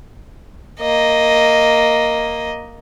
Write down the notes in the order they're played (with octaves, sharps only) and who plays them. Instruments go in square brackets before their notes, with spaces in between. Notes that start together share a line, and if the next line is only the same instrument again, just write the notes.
[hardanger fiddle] A#3 D#5